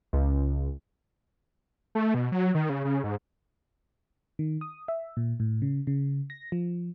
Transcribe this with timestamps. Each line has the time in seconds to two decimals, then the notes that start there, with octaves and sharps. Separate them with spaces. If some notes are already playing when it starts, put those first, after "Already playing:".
0.13 C#2
1.95 A3
2.14 B2
2.32 F#3
2.55 D#3
2.70 C#3
2.84 C#3
3.04 G#2
4.39 D#3
4.61 D#6
4.88 E5
5.17 A#2
5.40 A2
5.62 C#3
5.87 C#3
6.30 A#6
6.52 F3